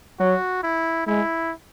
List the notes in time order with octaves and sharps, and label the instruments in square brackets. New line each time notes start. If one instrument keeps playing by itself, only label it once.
[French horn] F#3 [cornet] F#4
[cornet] E4
[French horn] G#3 [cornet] E4